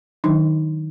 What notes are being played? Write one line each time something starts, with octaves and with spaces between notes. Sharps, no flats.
D#3 F#3 D4 D#4